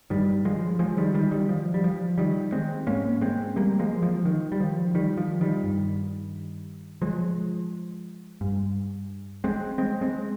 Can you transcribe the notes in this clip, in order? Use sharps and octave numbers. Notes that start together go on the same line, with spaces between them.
G2 D#3 G3
F3 G#3
F3 G#3
D#3 G3
D#3 G3
D#3 G3
F3
G3
F3
D#3 G3
G#3 C4
G#2 A#3 C#4
G#3 C4
G3 A#3
F3 G#3
F3
D#3
G3
F3
D#3 G3
F3
D#3 G3
G2
F3 G#3
G2
G#3 C4
G#3 C4
G#3 C4